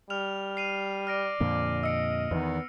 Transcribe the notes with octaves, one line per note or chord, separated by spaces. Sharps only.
G3 F6 F7
C7 D#7 F7
D5 F6 A#6 D7
F2 A#2 D3
D#5 E6 C#7 D7
E2 D#3 B3